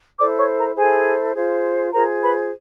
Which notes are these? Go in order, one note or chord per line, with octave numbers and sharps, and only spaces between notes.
E4 A4 C5 D5 D6
C#5 C#6
A#4 A#5
E4 G#4 A4 C5 G#5
F4 G#4 C5
F4 G#4 A#4 C5 A#5
B4 B5